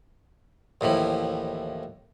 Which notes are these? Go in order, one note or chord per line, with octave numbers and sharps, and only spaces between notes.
D#2 A2 E3 F3